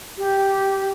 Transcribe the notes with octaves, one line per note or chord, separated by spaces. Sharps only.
G4